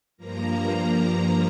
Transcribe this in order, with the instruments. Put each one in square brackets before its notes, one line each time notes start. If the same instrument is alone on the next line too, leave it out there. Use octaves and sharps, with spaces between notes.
[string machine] G2 F3 A#3 A#5